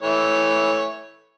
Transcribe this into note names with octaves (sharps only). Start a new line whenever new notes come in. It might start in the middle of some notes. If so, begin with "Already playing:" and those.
E3 A3 C#5